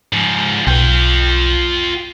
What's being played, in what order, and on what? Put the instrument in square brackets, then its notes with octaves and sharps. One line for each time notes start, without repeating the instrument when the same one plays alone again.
[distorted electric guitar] G#2 F3
[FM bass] B1 [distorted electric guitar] F4 G5